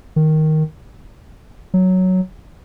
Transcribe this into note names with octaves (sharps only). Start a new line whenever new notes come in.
D#3
F#3